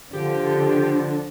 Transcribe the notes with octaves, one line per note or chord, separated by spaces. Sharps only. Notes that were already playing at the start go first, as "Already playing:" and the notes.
D3 F3 G4